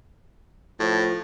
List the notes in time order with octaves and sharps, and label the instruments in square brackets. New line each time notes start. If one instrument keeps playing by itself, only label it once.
[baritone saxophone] A2 [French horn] F3